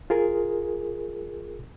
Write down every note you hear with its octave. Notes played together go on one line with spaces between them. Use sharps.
F4 G#4 A#4